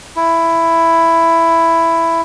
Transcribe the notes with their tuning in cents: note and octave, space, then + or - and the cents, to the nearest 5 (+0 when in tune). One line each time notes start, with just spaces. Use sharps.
E4 +10